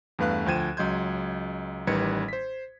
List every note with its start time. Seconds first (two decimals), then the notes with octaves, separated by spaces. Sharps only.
0.19 E2 G2 A3 B4 F5 F#6
0.46 D2 F3 G5 G#6 D#7 E7
0.77 C#2 F#3 D#5 C6 G6 G#6
1.87 A1 D#3 G3 B4 G#6 C#7
2.29 C5 B6